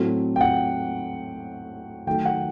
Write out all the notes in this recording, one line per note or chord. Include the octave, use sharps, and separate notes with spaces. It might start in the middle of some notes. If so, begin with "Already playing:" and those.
Already playing: A2 F#3 A3 C4
G5
F#5
D#3 F#3 A3 G5
F#5